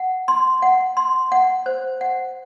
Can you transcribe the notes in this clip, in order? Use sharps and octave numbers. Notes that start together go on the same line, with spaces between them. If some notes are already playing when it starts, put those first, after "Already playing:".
Already playing: F#5
C6
F#5
C6
F#5
C5
F#5